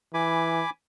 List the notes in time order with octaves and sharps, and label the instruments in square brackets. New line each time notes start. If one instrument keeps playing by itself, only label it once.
[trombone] E3 [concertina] G#5 B5 D6